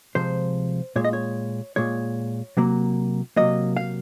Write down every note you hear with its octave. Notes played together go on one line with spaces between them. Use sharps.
C3 F3 G#3 C5
A#2 G#3 C#5
D#5
C#5
A#2 G#3 C#5
C3 F#3 A#3
C3 F#3 A#3 D#5
F5